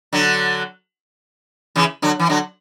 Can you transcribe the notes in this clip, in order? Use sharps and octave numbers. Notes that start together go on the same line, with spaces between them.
D3 F#3
C#3 E3
D3 F#3
E3
D3 F#3